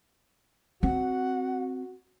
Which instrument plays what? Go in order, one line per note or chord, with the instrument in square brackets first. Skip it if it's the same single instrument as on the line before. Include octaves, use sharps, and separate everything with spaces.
[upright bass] C4 [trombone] F#4 [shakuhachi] F#5